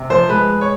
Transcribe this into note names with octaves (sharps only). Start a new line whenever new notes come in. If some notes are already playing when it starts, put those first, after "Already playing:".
Already playing: C3
F3 C5
G#3 B4
G#3
C#5